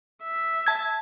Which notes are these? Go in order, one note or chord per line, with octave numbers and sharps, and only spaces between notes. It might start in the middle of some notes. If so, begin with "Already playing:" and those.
E5
A5 G#6